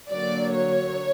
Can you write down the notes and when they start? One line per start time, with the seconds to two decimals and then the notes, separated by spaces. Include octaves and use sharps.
0.10 D3 F#3 A#3 D5
0.53 C#5